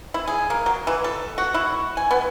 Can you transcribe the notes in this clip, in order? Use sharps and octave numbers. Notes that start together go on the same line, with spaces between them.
E4
G#4
A#3
F#3
E3
A4
F#4
E4
G#5
B3